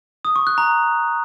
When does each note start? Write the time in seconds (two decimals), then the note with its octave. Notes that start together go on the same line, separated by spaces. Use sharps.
0.25 D#6
0.36 C#6
0.47 F#6
0.58 A#5